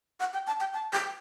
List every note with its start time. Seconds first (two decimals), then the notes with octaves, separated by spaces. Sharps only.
0.20 F#5
0.33 G5
0.47 A5
0.60 G5
0.74 A5
0.93 G5